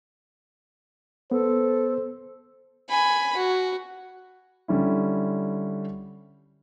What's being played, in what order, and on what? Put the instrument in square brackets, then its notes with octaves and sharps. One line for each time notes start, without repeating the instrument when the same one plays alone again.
[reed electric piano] B3 [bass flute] A4 [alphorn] C5
[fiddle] G#5 B5
F#4
[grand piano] D3 G3 C#4 E4